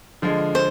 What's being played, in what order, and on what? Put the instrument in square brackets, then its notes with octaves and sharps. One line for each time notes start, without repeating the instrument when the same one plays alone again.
[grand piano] D3 F3 G#3
[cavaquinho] C5